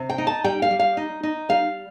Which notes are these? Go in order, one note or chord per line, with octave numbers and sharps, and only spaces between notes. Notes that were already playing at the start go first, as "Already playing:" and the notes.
Already playing: C3
G5
D#4
A5
G3 G5
F5
G3
F5
D#4
D#4
G3 F5